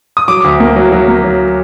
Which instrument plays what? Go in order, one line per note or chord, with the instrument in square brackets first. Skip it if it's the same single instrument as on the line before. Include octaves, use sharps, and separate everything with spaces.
[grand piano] D#6
F#3 D6
D2
A#3
F#3
F#3
A#3
F#3